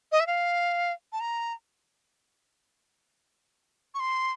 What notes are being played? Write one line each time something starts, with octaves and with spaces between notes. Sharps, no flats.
D#5
E5
F5
A5
A#5
C#6
C6